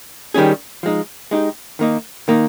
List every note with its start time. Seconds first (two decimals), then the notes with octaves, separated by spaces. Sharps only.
0.34 D#3 G3 C#4 G#4
0.83 F3 G#3 D#4
1.31 G#3 D#4 G4
1.79 D#3 A#3 D#4
2.28 D#3 A#3 D#4